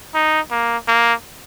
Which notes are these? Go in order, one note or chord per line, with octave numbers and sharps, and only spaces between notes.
D#4
A#3
A#3